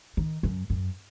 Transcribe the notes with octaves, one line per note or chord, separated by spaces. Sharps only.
D#3
F#2
F#2